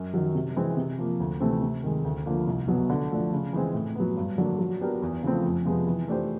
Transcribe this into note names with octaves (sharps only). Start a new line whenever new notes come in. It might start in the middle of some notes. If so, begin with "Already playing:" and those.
Already playing: F#2
D#3 F#3
C3
E3 G#3 C4
C3
F3 A#3
D2
C3 E3 A3 C4
C3
D#3 G#3
D2
D3 F3 A#3
C2
B2 F#3 B3
D3
F3 A3 D4
C#3
E3 G#3 C4
A2
F#3 B3
G2
D3 F#3 A#3 D4
F#3
B3 D4 G4 A#4
E2
C#3 F3 A3 C4
F2
C3 F3 G#3 B3
E3
A3 D4 G4 C5